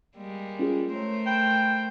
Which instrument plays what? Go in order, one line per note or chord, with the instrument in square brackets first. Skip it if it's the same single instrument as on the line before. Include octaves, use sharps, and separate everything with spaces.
[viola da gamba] G3 G#3 A#3
[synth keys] C#4 F4 G#4
[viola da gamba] A3 A#4 C5 [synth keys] C#5
[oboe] G5 [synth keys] B5 E7